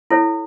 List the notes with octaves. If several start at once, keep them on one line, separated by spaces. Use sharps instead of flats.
E4 A4 C#5